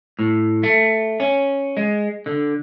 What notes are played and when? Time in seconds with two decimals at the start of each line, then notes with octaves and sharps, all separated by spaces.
0.19 A2
0.63 A3
1.20 C#4
1.77 G#3
2.26 D3